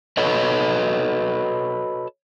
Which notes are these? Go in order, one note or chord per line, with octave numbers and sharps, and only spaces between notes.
F#4 A4 B4 C#5 D#5